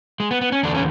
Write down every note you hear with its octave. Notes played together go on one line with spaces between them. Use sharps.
G#3
B3
B3
C#4
E2 D3 D4
C#4